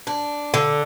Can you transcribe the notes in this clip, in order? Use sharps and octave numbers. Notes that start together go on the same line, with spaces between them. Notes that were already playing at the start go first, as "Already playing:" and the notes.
D4
D3